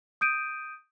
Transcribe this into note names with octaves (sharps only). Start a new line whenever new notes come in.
D#6 G6 D7 D#7